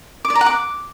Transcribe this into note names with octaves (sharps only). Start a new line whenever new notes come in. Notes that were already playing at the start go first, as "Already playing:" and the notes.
D6
D5
A#5
F#5
D6